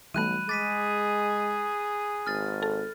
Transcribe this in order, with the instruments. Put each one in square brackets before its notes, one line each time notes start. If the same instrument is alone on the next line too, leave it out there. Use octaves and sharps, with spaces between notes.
[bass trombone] B1 [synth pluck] E3 G3 A3 [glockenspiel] B5 F#6 D#7
[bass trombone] G#3 [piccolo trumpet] G#4 [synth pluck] D6 [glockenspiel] A6 B6 D#7
[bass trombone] G#1 [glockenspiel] F6 A6
[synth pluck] A4